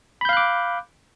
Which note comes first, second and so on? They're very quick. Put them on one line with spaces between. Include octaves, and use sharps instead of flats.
B5 G6 F5 F#6 D6